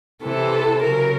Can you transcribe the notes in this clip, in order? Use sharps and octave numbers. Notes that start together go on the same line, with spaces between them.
C3 E3 A4
C#3 F#3 A#4